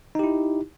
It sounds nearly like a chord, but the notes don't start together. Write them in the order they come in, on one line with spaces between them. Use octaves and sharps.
D#4 G4 E4